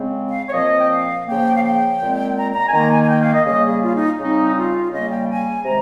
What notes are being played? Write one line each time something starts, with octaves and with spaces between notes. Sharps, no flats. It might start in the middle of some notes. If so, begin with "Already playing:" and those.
Already playing: C#3 G#3 C4
F5
C#5
A#2 F3 C4 D#5
G5
F5
C#3 F3 A#3 G5
F5
G5
A#2 G#3 C4
A#5
A#5
G#5
D#3 A#3 A#5
G#5
G#5
G5
F5
D#5
C#3 G3 A#3 D#5
G#4
F4
D#4
C#3 G3 C4 D#4
F4
C#3 G3 A#3 D#5
G5
G#5
C3 D#3 G#3 A#5